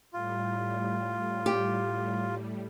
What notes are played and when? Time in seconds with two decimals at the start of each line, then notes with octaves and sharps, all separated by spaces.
0.13 A2 G3 F4
1.46 G4